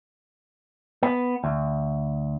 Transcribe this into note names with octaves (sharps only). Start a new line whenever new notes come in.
B3
D2